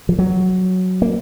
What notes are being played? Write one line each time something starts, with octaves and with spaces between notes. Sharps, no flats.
F3
F#3
A#3